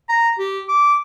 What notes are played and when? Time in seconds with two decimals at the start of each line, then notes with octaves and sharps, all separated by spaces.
0.09 A#5
0.39 G4
0.68 D6